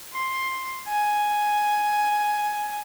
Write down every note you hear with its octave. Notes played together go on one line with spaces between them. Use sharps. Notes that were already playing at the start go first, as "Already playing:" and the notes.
C6
G#5